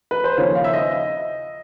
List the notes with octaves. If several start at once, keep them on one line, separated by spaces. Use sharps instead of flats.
B4
C5
D#2 C#3 F3 C#5
F5
E5
D#5